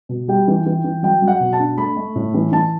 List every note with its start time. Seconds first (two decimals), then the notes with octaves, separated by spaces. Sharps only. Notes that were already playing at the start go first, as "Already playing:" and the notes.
0.09 B2
0.28 G3 G5
0.48 E3
0.66 E3
0.84 E3
1.03 F#3 G5
1.22 F#3
1.28 F#5
1.40 B2
1.53 A5
1.59 D4
1.77 A3 B5
1.97 A3
2.16 A2
2.34 E3
2.52 E3 A5